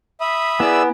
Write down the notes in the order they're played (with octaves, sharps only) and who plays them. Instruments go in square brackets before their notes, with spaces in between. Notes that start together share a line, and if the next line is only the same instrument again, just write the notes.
[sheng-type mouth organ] E5 B5 D#6
[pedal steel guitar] B3 [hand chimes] E4 G#5 [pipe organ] G#4 D5 E6